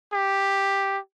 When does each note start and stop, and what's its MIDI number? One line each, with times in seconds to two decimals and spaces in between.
0.13 0.98 67